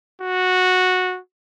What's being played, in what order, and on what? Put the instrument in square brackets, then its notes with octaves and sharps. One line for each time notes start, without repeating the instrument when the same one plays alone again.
[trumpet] F#4